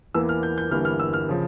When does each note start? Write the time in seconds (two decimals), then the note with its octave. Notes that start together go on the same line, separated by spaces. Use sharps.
0.14 E2 E3 A#3 E6
0.29 F6
0.43 G6
0.58 G6
0.71 G1 G2 E3 A#3 F6
0.85 F6
1.00 E6
1.13 F6
1.29 C#3 F3